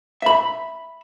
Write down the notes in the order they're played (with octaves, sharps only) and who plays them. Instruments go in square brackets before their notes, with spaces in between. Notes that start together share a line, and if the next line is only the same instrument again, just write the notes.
[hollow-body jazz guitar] E5 B5